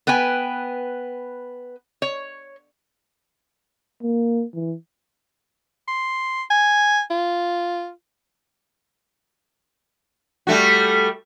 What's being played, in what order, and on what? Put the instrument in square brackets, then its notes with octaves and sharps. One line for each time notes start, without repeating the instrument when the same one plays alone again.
[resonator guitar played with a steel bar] B3 B4 G5 G#5
C#5
[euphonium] A#3
E3
[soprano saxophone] C6
G#5
F4
[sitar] G3 A3 F#4